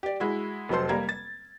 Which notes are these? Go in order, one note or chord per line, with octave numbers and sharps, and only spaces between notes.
G4 D5
G#3 E4 F#4
F1 F#3 A4 C5 C6
G3 A#3 A#5 G#6
A6